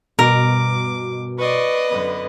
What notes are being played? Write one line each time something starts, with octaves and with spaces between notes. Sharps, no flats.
G2 B2 A#4 D6
B4 D5 D#5 C6 C#6
F#2 D3 B3